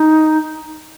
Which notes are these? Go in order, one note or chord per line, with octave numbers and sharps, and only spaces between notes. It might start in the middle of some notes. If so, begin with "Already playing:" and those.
Already playing: D#4